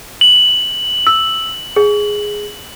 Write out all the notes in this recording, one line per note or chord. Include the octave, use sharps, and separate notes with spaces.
F#7
E6
G#4